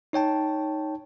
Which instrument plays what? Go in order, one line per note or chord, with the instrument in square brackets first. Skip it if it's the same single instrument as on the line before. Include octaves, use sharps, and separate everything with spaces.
[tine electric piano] D#4 C#5 G5 A5